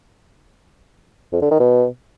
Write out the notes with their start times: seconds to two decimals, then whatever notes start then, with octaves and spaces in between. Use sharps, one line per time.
1.33 F2
1.42 D3
1.51 D#3
1.60 B2